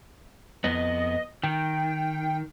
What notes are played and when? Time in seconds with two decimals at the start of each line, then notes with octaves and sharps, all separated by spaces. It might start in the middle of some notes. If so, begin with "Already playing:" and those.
0.64 F2 B3 D#5
1.43 D#3 G5